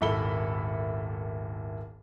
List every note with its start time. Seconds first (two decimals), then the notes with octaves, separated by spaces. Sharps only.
0.01 D#1 G#1 E4 A4 B5 G7